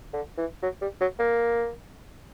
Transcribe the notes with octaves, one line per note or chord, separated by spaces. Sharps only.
D3
E3
F#3
G3
F#3
A#3